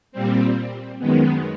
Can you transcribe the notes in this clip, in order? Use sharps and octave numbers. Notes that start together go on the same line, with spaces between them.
A#2 G3 C4
F#2 D#3 G#3 B3